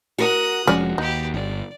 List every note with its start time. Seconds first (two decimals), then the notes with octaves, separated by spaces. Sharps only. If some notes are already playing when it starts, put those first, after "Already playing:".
0.18 F#4 A#4 F#5 D#6 F#6
0.67 F1 F3 G#3 C#4 F#4 D5
0.98 D#2 D#4 G4 B4
1.34 G1 D5